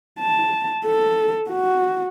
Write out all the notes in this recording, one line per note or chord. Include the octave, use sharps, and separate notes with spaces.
A5
A4
F#4